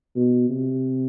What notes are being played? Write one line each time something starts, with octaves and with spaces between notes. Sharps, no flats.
B2
C3